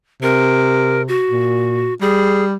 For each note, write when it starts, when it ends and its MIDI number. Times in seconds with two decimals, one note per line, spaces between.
0.23 1.21 48
0.23 1.02 70
1.08 1.94 66
1.31 1.90 46
2.01 2.56 55
2.01 2.44 68